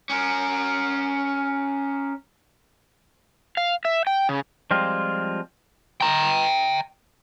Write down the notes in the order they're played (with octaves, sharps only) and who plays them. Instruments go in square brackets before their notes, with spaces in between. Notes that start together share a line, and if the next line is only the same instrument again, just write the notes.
[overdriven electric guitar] C#4 A#4
[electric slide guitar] F5
E5
G5
C#3
[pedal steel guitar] F3 G3 G#3 C4 F4
[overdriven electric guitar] G5 A#5